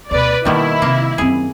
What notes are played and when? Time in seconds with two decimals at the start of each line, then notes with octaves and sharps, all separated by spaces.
0.11 D2 B2 B4 D5
0.45 B2 D#3 G3 A#3 D4 E4
0.82 C3 A#3
1.18 F#2 C4 G#4